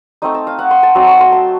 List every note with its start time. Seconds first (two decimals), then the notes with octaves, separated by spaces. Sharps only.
0.22 A3 C4 D#4 D#5
0.34 A5
0.47 F5
0.59 F#5
0.71 C6
0.83 A5
0.95 F#3 C4 D#4 C6
1.08 C#6
1.21 C6
1.32 A5